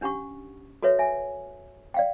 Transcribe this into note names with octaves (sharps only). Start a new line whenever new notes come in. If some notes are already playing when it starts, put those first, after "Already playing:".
C#4 D4 G4 F#5 C#6
F#4 A4 B4 C#5 E5
E5 G#5
D5 F5 G5